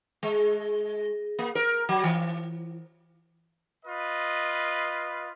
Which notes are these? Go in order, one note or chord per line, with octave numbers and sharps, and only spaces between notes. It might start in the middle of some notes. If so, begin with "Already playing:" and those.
G#3
A#3
A#4
F#3
E3
F4 B4 D#5